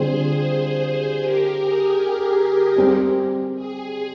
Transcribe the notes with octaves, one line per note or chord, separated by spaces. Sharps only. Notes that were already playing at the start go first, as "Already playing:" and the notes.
Already playing: D3 G3 C4 F4 G#4 C5
G4 A#4
G#4
G4
G3 C4 G4
G#4